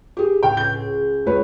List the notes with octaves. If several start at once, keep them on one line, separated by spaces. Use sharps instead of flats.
G4 G#4
C#2 A2 G5 F6
G6
G#4
C#2 B4 C#5